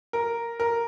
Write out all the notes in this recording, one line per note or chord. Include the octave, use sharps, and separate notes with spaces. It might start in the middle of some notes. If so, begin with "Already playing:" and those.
A#4
A#4